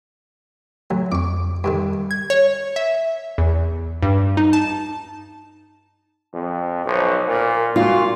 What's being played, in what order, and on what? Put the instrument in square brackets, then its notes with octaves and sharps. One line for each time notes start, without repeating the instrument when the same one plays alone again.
[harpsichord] D2 [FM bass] F#3
[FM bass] F2 [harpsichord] C#6 D6
[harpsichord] G2 D3 D#3
[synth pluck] G#6
C#5
E5
E2
G2
D#4
A5
[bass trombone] F2
[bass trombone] B1 [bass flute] C5
[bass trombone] A#2 [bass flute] A#4
[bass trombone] A#2 [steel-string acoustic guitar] F4 [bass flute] F#4